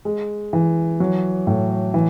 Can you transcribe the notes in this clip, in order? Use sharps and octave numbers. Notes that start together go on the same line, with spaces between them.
G#3
E3
F#3
A2
E3